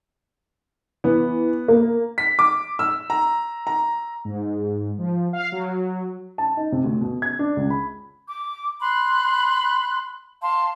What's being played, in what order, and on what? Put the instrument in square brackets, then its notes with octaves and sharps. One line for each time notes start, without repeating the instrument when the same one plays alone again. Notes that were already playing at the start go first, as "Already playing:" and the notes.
[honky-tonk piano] E3 [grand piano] B3
[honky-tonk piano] A#3
[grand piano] B6
D6
E6
A#5
A#5
[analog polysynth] G#2
F3
F5
F#3
[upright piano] A5
D#4
C3
D2
B2
G#6
D4
C#2
B5
[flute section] D6
B5 C6 F#6
F5 A5 C6